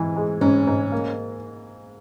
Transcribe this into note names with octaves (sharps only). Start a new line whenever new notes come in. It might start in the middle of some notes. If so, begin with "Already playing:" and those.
Already playing: G#2 E3
G#3
G#2 C#4
G#2
A#3